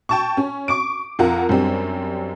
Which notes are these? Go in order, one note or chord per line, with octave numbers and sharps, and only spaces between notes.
G5 A5 C#6
C#4
C#6 D6 D7
F2 F4 A#4 F#5
F#2 G3 C4 D4